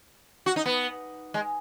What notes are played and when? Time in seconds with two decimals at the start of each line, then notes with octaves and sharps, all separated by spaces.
0.46 F#4
0.56 D#4
0.66 B3
1.34 G#3